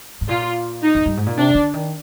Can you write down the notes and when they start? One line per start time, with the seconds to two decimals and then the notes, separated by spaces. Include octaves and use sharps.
0.21 G#2
0.28 A#2 F4
0.82 D#4
0.95 F2
1.06 G2
1.17 G#2
1.26 A#2
1.37 C3 D4
1.55 D3
1.74 D#3